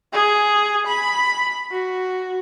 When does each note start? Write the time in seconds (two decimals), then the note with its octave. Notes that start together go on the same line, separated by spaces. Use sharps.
0.13 G#4
0.87 B5
1.71 F#4